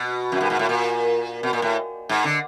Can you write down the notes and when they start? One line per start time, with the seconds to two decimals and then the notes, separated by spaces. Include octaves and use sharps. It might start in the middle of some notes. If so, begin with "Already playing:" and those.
Already playing: B2
0.32 F#2
0.41 G2
0.50 G#2
0.59 A2
0.69 A#2
1.43 B2
1.53 A#2
1.62 A2
2.09 G#2
2.24 D3